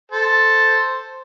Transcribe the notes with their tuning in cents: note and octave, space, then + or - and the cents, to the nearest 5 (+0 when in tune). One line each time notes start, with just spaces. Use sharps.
A4 +0 C5 +0